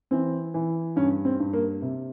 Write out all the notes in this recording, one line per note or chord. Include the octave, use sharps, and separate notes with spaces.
E3 C4
E3
G2 C#4
C4
G2
A#3
C3